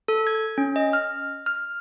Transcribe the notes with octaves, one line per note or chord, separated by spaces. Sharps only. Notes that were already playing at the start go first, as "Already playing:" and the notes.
A4
G#6
C#4
D#5
F6
F6